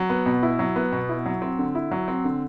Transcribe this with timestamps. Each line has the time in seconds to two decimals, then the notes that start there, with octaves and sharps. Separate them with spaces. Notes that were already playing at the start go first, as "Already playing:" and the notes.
Already playing: F#3
0.10 B3
0.26 B2
0.43 E4
0.59 F#3
0.76 B3
0.92 B2
1.09 E4
1.26 F#3
1.42 C4
1.58 D3
1.75 E4
1.91 F#3
2.08 C4
2.25 D3